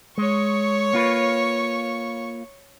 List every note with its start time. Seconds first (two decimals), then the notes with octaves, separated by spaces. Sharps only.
0.18 G#3 C#5 C#6
0.93 A#3 F4 B4